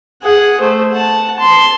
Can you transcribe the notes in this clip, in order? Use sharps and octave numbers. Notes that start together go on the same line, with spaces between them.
G#4 F#5
A3 C5
F#5 A5
A5 C6